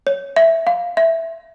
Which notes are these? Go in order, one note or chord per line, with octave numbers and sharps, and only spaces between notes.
C#5
E5
F5
E5